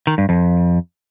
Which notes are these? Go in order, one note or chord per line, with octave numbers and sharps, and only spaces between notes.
D#3
G2
F2